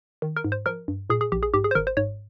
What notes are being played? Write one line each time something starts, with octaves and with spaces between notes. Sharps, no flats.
D#3
A#4
G#2
C5
F3 A#4
G2
A#2 G#4
G#4
A#1 G4
G#4
G#2 G4
G#4
C5
G#1 A#4
C5
G#2 C#5